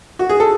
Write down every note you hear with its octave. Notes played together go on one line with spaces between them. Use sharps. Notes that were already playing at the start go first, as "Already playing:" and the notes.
F#4
G#4
A4